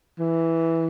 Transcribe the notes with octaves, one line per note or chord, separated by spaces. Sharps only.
E3